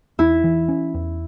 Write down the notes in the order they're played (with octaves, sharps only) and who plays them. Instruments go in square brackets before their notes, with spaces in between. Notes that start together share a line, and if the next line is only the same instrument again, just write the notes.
[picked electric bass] E2 [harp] E4
[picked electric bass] E3
C#4
E2